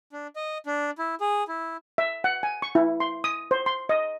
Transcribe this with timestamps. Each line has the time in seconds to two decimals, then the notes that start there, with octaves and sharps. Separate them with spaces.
0.13 D4
0.36 D#5
0.66 D4
0.98 E4
1.21 G#4
1.48 E4
1.98 E5
2.24 F#5
2.43 G#5
2.62 C#6
2.75 E4
3.00 C6
3.24 D#6
3.51 C5
3.66 C6
3.89 D#5